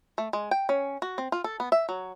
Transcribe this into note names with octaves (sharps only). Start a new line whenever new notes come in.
A3
G#3
G5
C#4
F#4
C4
F4
A4
B3
E5
F#3